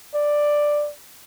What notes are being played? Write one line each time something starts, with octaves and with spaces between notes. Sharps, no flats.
D5